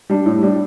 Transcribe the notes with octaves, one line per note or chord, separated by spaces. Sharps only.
G3 D4
A2
G3 D4